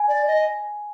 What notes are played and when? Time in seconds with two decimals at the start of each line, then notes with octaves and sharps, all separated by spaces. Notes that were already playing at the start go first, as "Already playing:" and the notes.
Already playing: G#5
0.08 D5
0.27 D#5